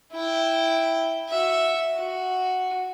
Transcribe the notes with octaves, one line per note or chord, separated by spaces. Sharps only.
E4 G5
F#4 E5
F#4